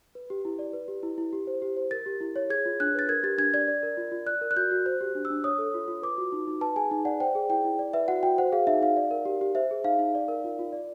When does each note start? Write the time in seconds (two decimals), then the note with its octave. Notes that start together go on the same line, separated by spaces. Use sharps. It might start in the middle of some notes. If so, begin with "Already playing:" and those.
0.15 B4
0.30 G4
0.45 E4
0.59 D5
0.73 B4
0.88 G4
1.03 E4
1.18 E4
1.33 G4
1.47 C5
1.62 G4
1.77 C5
1.91 A#4 A6
2.06 G4
2.21 E4
2.36 C#5
2.50 G#4 G#6
2.66 F4
2.80 D4 F#6
2.95 B4 A6
3.09 A#4 G#6
3.23 G4 A6
3.38 D4 G#6
3.54 D5 G#6
3.68 D5
3.83 A#4
3.97 F4
4.12 F4
4.26 D5 F#6
4.41 A#4
4.51 F#6
4.56 F#4 G6
4.71 F#4
4.86 C5 F#6
5.01 G4
5.15 D4
5.25 E6
5.30 D4
5.44 C#5 D#6
5.58 A4
5.74 F4
5.88 F4
6.02 B4 D6
6.18 F#4
6.32 D#4
6.48 D#4
6.61 B4 A5
6.76 G#4 G#5
6.91 D#4
7.05 D5 F#5
7.20 C5 G5
7.35 G#4
7.49 E4 G5
7.65 E4
7.79 D5
7.93 B4 E5
8.08 F#4 F#5
8.23 F#4 G5
8.38 C5 F#5
8.52 G#4 F5
8.67 D#4 E5
8.81 D#4 F5
8.97 D5
9.11 A#4
9.25 G4
9.41 G4
9.55 C5 E5
9.71 G#4
9.84 D#4 F5
9.99 D#4
10.15 D5
10.28 A#4
10.44 F4
10.59 F4
10.72 D5